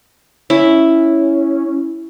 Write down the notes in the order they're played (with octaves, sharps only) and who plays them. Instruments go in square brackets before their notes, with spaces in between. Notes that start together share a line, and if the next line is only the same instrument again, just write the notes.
[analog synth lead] C#4 [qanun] E4